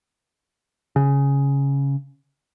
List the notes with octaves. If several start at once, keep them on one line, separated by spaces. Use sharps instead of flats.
C#3